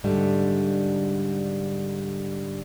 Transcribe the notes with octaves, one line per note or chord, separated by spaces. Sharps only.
G#2 D3 G3 A3